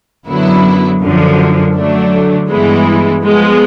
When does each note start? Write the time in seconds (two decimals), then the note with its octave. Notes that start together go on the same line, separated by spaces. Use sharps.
0.26 F#2 D3 F#3 B3 E4
1.01 F#2 D3 F3
1.75 D3 F#3 A3 D4
2.49 G2 E3 G#3 B3 E4
3.24 F3 G#3 B3